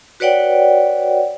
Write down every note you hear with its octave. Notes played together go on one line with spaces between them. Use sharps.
F#4 B4 C#5 D5 F#5 G5